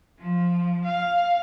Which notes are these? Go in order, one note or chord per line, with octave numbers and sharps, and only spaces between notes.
F3
F5